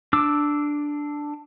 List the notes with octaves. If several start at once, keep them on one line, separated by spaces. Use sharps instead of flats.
D4 D6 E6